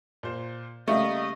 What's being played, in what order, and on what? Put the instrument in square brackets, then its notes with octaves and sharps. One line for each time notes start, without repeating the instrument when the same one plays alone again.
[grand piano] A#2 C5
[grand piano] C#3 G3 A#3 [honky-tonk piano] A3 [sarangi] D#5